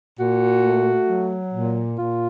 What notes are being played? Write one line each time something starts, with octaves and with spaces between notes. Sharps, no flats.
A#2 F#4
A3
F#3
A#2
A#2 F4